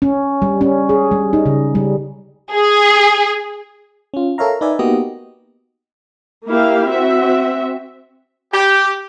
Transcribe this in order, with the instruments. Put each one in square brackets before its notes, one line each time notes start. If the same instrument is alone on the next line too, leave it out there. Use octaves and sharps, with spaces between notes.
[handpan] C#4
G3
C#4
G#4
G3
D#4
C#3
G3
[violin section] G#4
[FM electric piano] C#4 F4
A4 A#4 C#5 E5 F5 A#5
D#4 B4 D5 E5 G#5
A#3 B3 D#4 F#4 G4 D#5
[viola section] A#3 E4 G4 F5
C4 F#4 E5
[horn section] G4